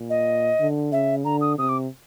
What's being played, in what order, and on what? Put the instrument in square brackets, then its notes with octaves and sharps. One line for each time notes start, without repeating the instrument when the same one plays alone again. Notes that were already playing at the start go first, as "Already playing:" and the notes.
Already playing: [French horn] A#2
[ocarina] D#5
[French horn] D3
[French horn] C#3 [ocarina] E5
[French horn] D3 [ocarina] A#5
[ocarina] D#6
[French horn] C3 [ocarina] D#6
[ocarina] D6